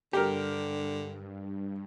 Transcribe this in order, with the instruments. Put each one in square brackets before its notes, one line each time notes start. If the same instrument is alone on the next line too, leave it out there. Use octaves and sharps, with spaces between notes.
[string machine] G2 [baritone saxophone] D3 [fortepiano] G4 A#4